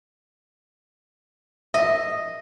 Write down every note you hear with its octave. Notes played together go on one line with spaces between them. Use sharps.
D#5 E5